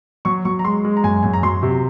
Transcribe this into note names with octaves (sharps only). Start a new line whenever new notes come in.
F#3 C#6
F#3 C#6
A#5
G#3 C6
G#3
A#5
F#2 G#5
F#2 G#5
A#5
F#3 C6
C3